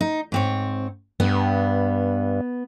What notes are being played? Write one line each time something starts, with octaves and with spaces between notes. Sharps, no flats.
D#4
G#2 C4 C#5
G2 B3